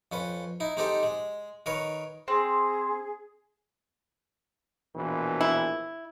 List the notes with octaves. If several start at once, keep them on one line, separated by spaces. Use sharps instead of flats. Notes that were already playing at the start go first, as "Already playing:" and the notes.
F2 C#4 B4
D#4 E4
G#3 C4 D#4 G4 A4
G#3
D#3 A#4 B4 C#5
C4 G#4
A#1 B2 E3
E4